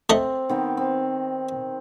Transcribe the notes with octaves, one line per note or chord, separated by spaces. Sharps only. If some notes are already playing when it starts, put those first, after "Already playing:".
A3 C4 D#5
D#3 B3 C4
C4